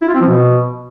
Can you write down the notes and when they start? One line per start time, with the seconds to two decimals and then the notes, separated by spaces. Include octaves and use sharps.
0.02 E4
0.08 F4
0.15 C4
0.21 F3
0.28 B2